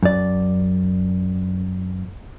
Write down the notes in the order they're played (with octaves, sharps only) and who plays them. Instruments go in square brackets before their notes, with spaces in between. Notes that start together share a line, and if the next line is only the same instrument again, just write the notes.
[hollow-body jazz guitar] F#2 D5